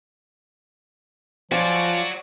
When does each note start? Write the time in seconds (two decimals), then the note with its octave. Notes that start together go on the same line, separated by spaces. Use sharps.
1.51 F3 F4 F#4 C#5 D5 G#5